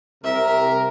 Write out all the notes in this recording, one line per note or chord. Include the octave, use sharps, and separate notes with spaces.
C2 C3 A#4 E5